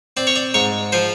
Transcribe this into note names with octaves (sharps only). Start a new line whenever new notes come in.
C4 D5
C#5
D5
G#2 C#5
F3 C5